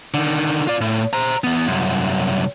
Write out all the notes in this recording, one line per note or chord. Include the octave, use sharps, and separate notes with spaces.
D3 D#3
F4 D5
A2
C5 A#5
E3 B3
C2 F#2